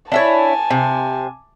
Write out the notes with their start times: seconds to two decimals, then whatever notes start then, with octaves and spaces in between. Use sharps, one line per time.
0.12 D4 E4 C#5 G#5 A5
0.70 C3